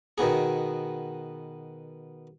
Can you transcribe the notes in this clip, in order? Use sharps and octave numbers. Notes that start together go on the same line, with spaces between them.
B2 D#3 B3 G#4